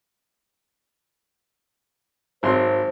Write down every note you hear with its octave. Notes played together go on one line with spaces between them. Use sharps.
G#1 F#3 C5 C6